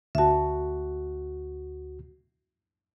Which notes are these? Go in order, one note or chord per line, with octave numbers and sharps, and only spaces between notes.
D2 F#4 E5 A5